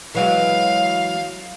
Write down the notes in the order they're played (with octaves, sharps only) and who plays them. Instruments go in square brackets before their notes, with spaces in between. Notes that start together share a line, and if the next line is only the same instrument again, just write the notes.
[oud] E3 F#3 G#3 [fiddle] F5